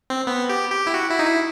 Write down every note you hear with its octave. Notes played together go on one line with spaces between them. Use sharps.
C4
B3
G4
G4
E4
F#4
E4
D#4
E4